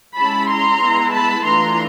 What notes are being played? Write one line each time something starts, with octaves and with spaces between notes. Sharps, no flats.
G#3 C#4 E4 A5 B5
A#5 C6
G#3 B3 E4
A5 B5
E3 A3 D4 F4 A#5 C6